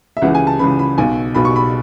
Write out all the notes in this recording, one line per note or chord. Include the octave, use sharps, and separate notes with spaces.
E5
C#2 C#3 E3 F#5
G#5
A5
C#2 C#3 E3 B5
B5
B1 B2 G#5
B1 B2 B5
C#6
B5